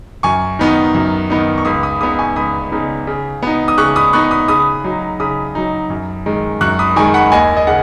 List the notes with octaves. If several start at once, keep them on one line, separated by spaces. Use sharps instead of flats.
F#2 G#5 C#6
D#3 B3 D#4
F#2
D#3 B3 D#4
C#6
C#2 B5 D#6
B5 D#6
C#3 B3 D#4 B5 D#6
G#5 C#6
C#2 B5 D#6
C#3 B3 D#4
C#3
B3 D#4
D#6
C#3 C#6 F#6
B5 D#6
B3 D#4 C#6 F#6
B5 D#6
C#3 B5 D#6
F#3 D#4
C#3 B5 D#6
F#3 D#4
F#2
D#3 G#3
F#2 C#6 F#6
B5 D#6
D#3 G#3 G#5 C#6
F#5 B5
D#2 D#5 G#5
D#5
C#3 F#5